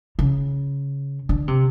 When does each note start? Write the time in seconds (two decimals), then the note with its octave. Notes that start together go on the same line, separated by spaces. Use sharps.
0.19 C#3
1.29 D3
1.48 C3